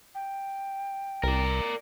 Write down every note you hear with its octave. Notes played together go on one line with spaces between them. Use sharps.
G5
C2 A#4 D5